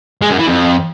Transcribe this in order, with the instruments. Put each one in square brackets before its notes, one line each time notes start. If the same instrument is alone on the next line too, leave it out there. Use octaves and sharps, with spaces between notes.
[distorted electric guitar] G#3
F#2
E3
F2